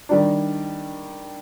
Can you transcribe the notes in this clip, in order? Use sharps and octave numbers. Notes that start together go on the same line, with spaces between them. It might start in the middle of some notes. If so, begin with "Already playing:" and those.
D#3 G3 D4